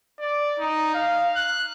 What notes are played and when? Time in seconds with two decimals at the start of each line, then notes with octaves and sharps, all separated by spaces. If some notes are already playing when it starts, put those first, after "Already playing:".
0.20 D5
0.60 D#4
0.94 F5
1.36 F#6